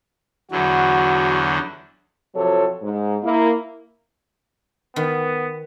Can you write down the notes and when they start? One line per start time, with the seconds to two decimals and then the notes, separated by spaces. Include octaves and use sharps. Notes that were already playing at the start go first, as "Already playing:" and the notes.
0.51 E2 D3 F#3 F#4
2.34 C3 F3 F#3 A4 C#5
2.82 G#2
3.23 A#3 E4
4.96 D#3 B3